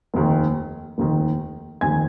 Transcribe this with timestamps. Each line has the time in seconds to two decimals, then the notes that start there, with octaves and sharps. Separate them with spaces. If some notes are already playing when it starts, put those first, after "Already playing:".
0.14 F1 D#2 D#3
0.98 F1 D#2 D#3
1.81 F1 D#2 D#3 G#5 G#6